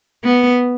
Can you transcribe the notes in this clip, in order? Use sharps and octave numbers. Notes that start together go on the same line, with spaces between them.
B3